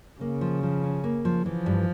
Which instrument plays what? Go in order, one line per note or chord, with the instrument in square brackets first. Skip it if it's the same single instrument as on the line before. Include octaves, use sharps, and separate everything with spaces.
[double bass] C#3 [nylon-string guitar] A#3
[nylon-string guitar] F3
F3
C#4
A#3
F3
[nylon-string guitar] E3 [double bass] F3
[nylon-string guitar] G2